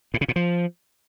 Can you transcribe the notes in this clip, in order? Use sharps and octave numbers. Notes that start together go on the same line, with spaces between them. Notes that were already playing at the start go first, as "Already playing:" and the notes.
A2
C#3
A#2
F3